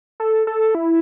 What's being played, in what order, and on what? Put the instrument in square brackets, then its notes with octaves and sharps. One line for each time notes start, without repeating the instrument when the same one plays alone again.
[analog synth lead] A4
A4
E4